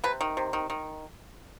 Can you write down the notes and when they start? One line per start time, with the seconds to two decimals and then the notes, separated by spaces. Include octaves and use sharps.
0.04 C3 B4
0.21 D#3
0.37 C3
0.53 D#3
0.70 D#3